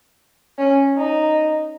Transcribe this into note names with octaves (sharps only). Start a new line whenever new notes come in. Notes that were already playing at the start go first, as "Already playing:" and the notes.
C#4
D#4